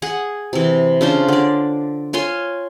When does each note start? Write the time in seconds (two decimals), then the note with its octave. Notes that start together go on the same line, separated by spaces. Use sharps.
0.02 G#4 F#5 G#5
0.53 C3 E3
1.01 C#3 D4 F4 C5
1.28 D3 D5
2.13 F4 C#5 G#5 C6